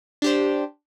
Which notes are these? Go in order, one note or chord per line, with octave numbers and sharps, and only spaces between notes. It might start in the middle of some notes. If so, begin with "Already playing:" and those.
D4 G4 C5